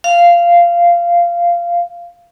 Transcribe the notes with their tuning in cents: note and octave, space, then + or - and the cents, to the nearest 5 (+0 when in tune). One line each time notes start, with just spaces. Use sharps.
F5 -15